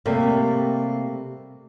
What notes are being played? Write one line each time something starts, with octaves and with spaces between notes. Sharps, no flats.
C3 G3 A3 A#3